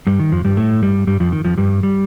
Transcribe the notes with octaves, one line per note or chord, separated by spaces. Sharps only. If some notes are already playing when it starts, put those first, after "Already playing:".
G2 G3
D#3
F2 F3
G2 G3
A2 A3
G2 G3
G2 G3
F2 F3
D#3
F2 F3
G2 G3
G3